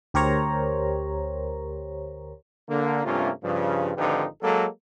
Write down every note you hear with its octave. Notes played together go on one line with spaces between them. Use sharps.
D2 G4 A#4 C5 C#5 A#5
D3 A#3
G2 C3 A3 A#3 C#4 F4
G2 C#3 F3
G#1 D3 F3 D#4 G4 B4
F#3 G#3 A#3 A4